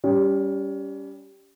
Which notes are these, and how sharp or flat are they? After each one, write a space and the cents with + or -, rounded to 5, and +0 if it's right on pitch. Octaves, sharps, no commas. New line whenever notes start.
G3 +0 C#4 +25